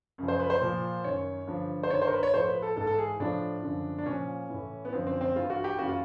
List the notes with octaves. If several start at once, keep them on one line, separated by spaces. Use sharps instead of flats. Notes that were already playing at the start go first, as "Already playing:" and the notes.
F#2 C#3 F3
C5
B4
C5
A#2 F3
F#2 D#3 C#5
G2 D3 F3
C5
G2 D#3 C#5
C5
A#4
B4
C#5
A2 F3 C5
B4
A4
G#2 E3 A4
A4
G#4
A2 F3 D4
F#2 D3 F3
D4
A#2 F3 C#4
A2 E3
B3
F#2 D3 F3 C4
C4
C4
G2 E3 F4
F#4
G4
F#2 C#3 E3 F#4
F4